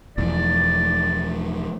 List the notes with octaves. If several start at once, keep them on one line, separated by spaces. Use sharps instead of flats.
E1 E2 F3 D5